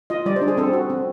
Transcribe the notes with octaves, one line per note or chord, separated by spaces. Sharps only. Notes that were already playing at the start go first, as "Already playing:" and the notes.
F4 D#5
G3 D5
C5
D4
G#4
C4 A4
F#4
C4